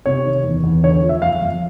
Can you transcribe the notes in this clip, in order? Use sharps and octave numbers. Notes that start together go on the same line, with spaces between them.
C3 C#5
D#3
E2
E2
D3 C#5
F3
E5
F2 F5
F2